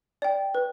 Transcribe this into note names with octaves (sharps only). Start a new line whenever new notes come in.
D5 G5
B4